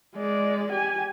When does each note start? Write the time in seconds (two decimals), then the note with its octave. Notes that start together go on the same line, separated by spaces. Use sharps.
0.16 G#3 D5
0.72 G4 G#5